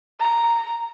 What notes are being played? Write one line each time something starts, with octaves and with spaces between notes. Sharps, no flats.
A#5